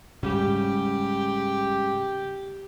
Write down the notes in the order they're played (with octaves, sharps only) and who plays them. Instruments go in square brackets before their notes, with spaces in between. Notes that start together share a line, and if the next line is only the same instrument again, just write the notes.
[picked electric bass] G#2 C#3 G3 [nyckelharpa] G4